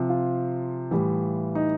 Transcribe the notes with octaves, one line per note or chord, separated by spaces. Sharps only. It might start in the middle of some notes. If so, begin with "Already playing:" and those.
Already playing: C3 F3
F4
A2 E3 G3
D#4